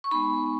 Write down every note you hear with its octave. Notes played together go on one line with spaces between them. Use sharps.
C#6
G#3 B3 D#4 B5